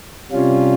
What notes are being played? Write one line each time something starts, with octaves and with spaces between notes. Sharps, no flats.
C3 G3 C#4 F4